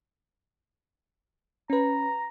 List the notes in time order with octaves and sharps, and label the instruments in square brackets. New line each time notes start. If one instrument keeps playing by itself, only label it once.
[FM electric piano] C#4 B4 [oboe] A#5